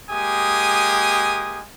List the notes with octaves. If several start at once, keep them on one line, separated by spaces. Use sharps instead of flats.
G#3 A#3 G4 G#5 D#6